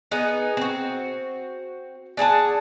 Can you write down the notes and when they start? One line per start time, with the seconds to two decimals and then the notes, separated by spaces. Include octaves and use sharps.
0.11 B3 D#4 G#4
0.57 C4 F#4
2.17 D4 G#4 F#5 A5